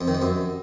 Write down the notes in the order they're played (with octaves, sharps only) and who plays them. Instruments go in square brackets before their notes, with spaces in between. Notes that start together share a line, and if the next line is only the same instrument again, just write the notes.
[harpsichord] F2
D#3
F2
F#2